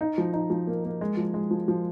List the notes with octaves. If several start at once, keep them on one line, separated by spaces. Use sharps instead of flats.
D#4
F3
D#4
F3
A#3
A#3
G#3
F3
G#3
F3
F3